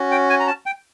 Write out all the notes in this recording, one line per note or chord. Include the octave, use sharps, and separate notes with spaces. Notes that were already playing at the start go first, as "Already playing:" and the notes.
Already playing: C#4 F#4
G5
G#5
A#5
A5
G5